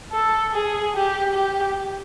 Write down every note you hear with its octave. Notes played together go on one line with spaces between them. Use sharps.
A4
G#4
G4
G4